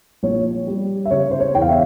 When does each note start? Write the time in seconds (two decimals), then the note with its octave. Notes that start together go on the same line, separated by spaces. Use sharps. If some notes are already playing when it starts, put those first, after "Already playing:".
0.23 A#1 C#5
0.67 G3
1.05 E5
1.11 C#3 C#5
1.31 C5
1.40 C#5
1.55 E2 G5
1.62 F5
1.70 E5